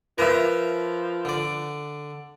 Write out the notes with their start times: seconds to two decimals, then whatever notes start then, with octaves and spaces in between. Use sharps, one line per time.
0.18 F3 A#4 B4 E5 A#5
1.25 D3 D5